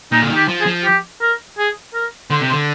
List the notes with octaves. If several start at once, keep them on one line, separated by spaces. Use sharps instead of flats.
A#2 D#4
D3
D#3
G4
F3
G#4
F3
G4
A#4
G#4
A#4
D3 C5
C3
C5
D3